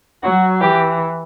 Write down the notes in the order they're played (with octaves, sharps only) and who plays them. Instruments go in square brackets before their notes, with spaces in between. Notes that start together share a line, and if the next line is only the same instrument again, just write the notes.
[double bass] F#3 [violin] F#4
[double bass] E3 [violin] G4